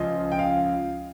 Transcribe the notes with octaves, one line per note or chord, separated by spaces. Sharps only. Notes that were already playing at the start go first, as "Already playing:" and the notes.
Already playing: C#2 C#3 F3 D#5
G5
F5